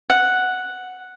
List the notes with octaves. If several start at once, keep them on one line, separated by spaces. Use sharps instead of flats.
F#5